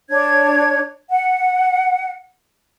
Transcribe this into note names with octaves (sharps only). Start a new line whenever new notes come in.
D4 C#5 G#6
F#5